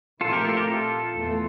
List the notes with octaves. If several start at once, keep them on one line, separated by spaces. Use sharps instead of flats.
A#1 A#2 A3 C4 E4 F4 A4
G4 A#4
F4 A4
G4 A#4
F4 A4
E2 E3 A3